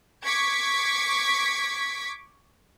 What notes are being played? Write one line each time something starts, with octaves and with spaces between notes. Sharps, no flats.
C#6 D6 G#6 B6